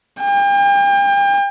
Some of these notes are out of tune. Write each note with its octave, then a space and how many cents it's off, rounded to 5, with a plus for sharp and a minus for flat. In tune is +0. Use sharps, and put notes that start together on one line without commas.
G5 +40